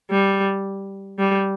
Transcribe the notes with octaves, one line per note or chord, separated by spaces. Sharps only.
G3
G3